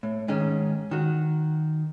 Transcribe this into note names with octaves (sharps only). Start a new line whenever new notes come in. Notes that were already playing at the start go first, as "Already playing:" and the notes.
A2
G#2 D#3 C#4
D#3 F#4